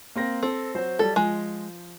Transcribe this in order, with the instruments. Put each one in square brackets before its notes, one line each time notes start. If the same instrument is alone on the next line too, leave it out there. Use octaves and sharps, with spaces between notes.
[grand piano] A#3 C4 A#6
[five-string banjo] C4 [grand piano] A4
[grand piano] F#3 F#4 C5
[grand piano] F#3 G3 [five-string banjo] A4
[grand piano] F3 [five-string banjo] G#3